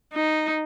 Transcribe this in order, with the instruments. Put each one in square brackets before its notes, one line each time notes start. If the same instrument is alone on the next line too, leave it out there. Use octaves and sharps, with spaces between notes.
[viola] D#4